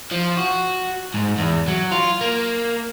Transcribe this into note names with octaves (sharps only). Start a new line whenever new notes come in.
F3
F#4
G#2
E2
F#3
F4
A#3